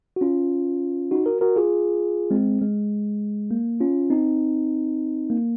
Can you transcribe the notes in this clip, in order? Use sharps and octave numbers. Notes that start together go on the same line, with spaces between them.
F#4
C#4 F4
D#4 F#4
F#4 A#4
F#4 A#4
F4 G#4
G#3 C4
G#3
A#3
C#4 F4
C4 D#4
A#3